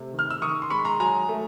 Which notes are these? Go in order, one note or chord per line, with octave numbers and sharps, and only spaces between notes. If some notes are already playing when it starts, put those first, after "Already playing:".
Already playing: C3 A3
D#3
F6
E6
D#3 C#6 D#6
C6
G#3 B5 C#6
A#5 C6
F#3 G#5 A#5
A3